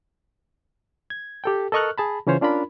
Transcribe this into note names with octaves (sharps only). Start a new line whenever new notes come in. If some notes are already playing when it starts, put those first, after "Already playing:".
G#6
G4 A4 G5
A4 A#4 D#5 C#6 F6 F#6
G#4 A5 B5
C#3 E3 C#4 F4 C5 C#5
C#4 D4 F4 A#4 B5